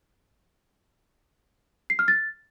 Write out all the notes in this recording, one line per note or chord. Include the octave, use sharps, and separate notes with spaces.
C7
F6
A6